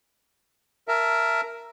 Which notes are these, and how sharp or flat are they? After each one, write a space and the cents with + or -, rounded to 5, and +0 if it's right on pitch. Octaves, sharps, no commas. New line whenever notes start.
A#4 +0 E5 +15 A5 -10